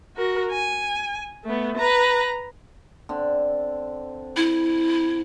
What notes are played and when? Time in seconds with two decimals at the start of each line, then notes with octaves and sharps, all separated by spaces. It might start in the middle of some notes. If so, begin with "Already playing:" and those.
0.16 F#4 A#4
0.51 G#5
1.44 A3 B3
1.77 B4 A#5
3.09 D3 C4
4.36 E4